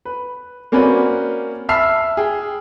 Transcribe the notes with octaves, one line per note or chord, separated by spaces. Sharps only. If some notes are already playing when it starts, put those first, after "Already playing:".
B4
A#3 C4 C#4 F#4 B4 D5
E5 A5 B5 E6 F6 C7
G#4 G5